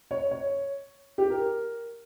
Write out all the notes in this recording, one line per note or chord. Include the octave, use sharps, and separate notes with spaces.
C#5
C#5
G4
A#4